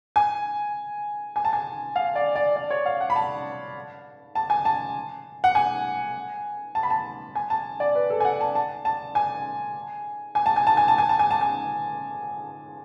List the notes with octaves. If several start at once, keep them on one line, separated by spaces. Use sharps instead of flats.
G#5
G#5
A5
G#5
F5
D5
D5
D5
C#5
F5
F#5
B5
A5
A5
G#5
A5
F#5
G#5
A5
B5
A5
G#5
A5
D5
B4
A4
G#5
F#5
A5
A5
A5
G#5
G#5
A5
G#5
A5
G#5
A5
G#5
A5
G#5
A5
G#5